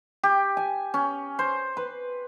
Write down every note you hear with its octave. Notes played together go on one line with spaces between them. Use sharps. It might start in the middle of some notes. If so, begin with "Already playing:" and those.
G4
G#5
C#4
C5
B4